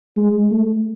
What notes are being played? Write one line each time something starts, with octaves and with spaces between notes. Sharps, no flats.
G#3
A3